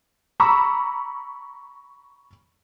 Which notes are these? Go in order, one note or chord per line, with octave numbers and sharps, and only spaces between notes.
A#5 B5 C#6 D6 E6